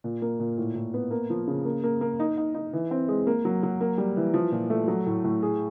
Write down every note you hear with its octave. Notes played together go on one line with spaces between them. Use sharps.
A#2
A#3
A#2
A2
A2
B3
A#3
F3
C#3
A#3
A#3
A#3
D#4
D#4
D#4
E3
C4
G#3
A#3
F#3
F#3
A#3
G3
E3
F3
A#2
A3
F#3
A2
A2
G#4